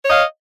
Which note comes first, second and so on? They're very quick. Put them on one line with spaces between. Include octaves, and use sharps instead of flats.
C#5 D#5 F5